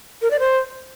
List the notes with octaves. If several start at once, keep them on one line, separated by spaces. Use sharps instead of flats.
A#4
D5
C5